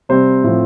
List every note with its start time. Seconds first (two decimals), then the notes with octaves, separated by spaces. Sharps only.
0.09 C3 G3 C4 C5
0.44 A2 F3 C4